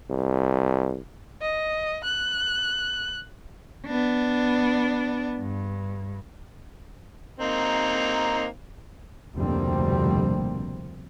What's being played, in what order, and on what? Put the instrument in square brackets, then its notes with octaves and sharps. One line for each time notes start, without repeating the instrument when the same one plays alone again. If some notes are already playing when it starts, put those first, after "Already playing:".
[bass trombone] C2
[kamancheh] D#5
F#6
[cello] B3 D4
G2
[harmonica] A#3 C4 D#4
[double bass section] F1 D2 B2 G3 A#3 C4